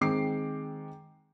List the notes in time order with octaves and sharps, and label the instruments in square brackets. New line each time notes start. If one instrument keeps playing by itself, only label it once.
[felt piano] D#3 G#3 C4 D6 C7